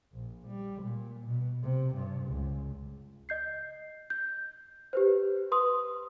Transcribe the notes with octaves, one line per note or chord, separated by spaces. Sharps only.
A#1
G3
A#2
B2
C3
G2
C#2
D#5 G6 C7
G6
G4 B4 C5
B4 C6 D#6